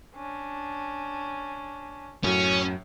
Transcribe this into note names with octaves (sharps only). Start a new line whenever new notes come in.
C#4 D4
F#2 A2 F#3 C#4